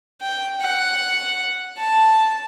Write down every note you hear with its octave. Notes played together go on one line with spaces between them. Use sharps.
G5
F#5
A5